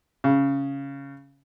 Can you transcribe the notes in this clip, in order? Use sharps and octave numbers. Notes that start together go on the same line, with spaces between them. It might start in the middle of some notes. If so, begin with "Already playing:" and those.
C#3